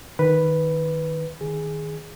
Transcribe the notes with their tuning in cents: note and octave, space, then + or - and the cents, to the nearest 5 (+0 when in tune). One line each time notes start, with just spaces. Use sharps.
D#3 +0 B4 +0
D#3 +0 G#4 +0